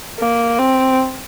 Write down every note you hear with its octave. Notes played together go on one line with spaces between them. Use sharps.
A#3
C4